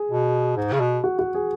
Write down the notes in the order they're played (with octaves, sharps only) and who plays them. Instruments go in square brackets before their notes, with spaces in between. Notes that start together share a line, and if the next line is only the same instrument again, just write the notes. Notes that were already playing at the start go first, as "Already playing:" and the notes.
Already playing: [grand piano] G#4
[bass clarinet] B2
G#2
C#3
B2
[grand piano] F#4
F#4
G#4